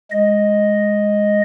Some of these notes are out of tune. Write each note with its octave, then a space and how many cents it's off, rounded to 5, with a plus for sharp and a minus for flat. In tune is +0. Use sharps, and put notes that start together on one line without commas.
G#3 +0 D#5 +0